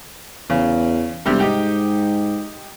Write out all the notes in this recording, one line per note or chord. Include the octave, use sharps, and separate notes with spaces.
E2 C#3
E1 C3 G3
G#2 D#4 G4